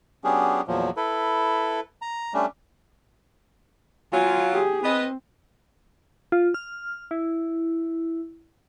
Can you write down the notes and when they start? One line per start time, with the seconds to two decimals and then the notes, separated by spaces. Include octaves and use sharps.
0.24 F#3 B3 C#4 D4 G4 G#4
0.68 E2 A#2 F3 F#3
0.97 E4 A4 B4
2.02 A#5
2.34 G3 A3 C#4 D4
4.13 F#3 F4 G#5
4.52 G4 G#4
4.84 B3 C4 B4 D#5
6.32 F4
6.54 F6
7.11 E4